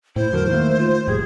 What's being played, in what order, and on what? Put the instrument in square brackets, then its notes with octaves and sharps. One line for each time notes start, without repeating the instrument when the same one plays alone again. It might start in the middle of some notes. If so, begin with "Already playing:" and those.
[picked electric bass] A2 [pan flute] E4 [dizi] C5
[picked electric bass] E2 D3 F#3 [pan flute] A#4
[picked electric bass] D#3 A3 [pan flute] A#3
[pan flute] F4
[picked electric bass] F1 A2 G3 [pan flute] G#4 [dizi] G#6